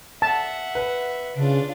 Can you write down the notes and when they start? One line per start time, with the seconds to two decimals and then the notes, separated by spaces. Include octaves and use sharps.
0.22 E5 F#5 A5
0.75 B4
1.36 C#3 D4 F4